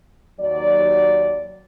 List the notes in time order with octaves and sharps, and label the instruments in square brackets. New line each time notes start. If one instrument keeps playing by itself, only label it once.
[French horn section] D#2 F#3 D5